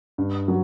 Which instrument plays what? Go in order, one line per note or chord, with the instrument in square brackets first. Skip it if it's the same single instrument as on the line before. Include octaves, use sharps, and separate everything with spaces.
[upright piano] G2
F#3